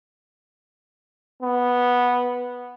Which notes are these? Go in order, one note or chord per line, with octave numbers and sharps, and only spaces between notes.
B3